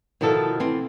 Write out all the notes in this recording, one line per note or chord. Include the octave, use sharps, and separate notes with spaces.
B2 D#3 F3 E4 A4
E3 C4 F4